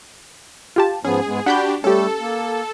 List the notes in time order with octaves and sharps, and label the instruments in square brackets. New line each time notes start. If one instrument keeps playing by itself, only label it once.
[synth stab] F4 G4 A5
[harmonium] G#2 F3 B3 [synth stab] C#4 [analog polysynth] G#4
[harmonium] G#2 G#3 B3
[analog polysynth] D4 G4 [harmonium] F#4 [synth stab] F#5 B5 G6
[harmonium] G3 A3 [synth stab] C#4 G4 [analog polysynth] A4
[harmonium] A#3